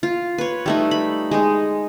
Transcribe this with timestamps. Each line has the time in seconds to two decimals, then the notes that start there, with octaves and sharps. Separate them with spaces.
0.03 F4
0.38 B4 C#5
0.66 G3 A3 D#4
0.91 B5
1.31 G#3 D#4